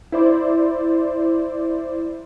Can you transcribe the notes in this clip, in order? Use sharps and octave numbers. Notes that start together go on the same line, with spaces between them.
E4 C5 D5